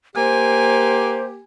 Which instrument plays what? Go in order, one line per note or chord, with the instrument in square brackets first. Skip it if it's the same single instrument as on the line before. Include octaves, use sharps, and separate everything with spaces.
[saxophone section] A#3 G4 [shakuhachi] C5 [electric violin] G#5